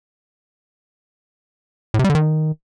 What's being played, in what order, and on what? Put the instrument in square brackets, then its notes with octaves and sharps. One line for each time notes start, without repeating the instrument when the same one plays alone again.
[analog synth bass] A2
C3
G3
D3
D#3